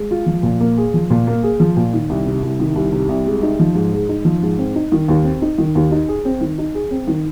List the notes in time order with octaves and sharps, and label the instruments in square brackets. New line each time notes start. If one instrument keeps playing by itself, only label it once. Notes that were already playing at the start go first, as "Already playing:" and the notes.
Already playing: [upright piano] G#3
F4
F3
A#2
A#3
G#4
F3
A#2
A#3
G#4
F3
A#2
D#3
C2
C3
C2
D#3
C2
C3
C2
G#3
D#4
F3
G#2
G#3
D#4
F3
G#2
C4
D#4
D#3
D#2
C4
D#4
D#3
D#2
D#4
G#4
C4
D#3
D#4
G#4
C4
D#3